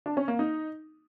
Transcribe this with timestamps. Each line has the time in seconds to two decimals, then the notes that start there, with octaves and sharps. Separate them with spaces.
0.06 D4
0.17 C#4
0.28 A#3
0.39 D#4